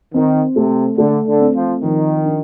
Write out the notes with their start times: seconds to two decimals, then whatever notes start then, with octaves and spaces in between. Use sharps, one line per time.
0.14 D#3 C4
0.56 C3 A3
0.98 D3 A3
1.27 D3
1.40 C4
1.54 F3
1.83 D#3 F3
2.25 D4